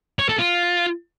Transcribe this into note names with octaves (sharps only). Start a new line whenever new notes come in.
C#5
A4
F4